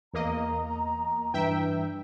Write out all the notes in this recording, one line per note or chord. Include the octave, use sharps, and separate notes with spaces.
E2 A#3 D#5 A#5
G2 E3 E5 G5